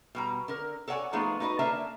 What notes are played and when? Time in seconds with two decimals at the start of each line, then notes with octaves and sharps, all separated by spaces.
0.15 B2 G3 A#5
0.48 D3 A#4
0.88 A4 C#5 D5 F#5 G#5
1.13 F3 G#3 A3 B3 D#4 F4
1.40 D#4 F#4 B4 C#5 D#5
1.59 D3 A#3 D4 E5 A5 A#5